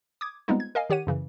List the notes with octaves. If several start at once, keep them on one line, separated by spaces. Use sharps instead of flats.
D6 D#6 G#6
G3 G#3 B3 C4 D#4 F4
G#6
A#4 D#5 F5 G#5
D#3 G4 C#5 F#5 D#7
F#2 C#3 E3